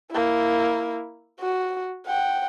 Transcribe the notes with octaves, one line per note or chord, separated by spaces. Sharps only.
A#3 E4
F#4
F#5 G5